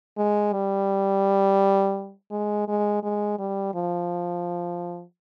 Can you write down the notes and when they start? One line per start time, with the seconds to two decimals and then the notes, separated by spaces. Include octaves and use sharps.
0.17 G#3
0.52 G3
2.31 G#3
2.68 G#3
3.03 G#3
3.39 G3
3.75 F3